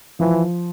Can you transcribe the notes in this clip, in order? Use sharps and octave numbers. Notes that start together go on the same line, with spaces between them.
E3 F3